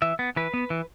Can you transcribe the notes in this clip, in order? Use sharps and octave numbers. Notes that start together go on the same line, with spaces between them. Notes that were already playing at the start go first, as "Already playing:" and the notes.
E3 E5
B3
E3 B4
B3
E3